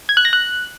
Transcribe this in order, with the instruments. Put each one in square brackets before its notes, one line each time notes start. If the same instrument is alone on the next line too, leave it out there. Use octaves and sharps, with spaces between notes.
[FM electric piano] G#6
F#6
A#6
F#6